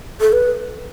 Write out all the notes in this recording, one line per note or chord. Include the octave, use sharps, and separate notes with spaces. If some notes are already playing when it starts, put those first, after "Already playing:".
A4
B4